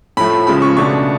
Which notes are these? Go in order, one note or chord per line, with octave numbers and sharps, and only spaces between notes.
A2 F3 A3 B5
C#3 F3 G#3 B5
C#6
C#2 B2 A3 D4 C#6